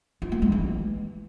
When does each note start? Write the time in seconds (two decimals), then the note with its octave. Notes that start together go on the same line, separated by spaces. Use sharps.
0.22 F4
0.32 A#3
0.42 G#3
0.52 E3